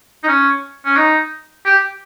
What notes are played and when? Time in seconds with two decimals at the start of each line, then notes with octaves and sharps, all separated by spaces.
0.24 D#4
0.28 C#4
0.85 C#4
0.97 D#4
1.65 G4